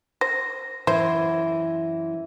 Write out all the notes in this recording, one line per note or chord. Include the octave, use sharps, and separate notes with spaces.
C5 A#6
F#2 E3 C5 E5